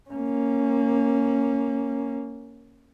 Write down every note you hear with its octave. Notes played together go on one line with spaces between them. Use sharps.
A#3 C#4